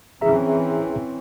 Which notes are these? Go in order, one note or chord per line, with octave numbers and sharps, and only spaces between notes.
E3 C4 C#4 G#4 E5 A#5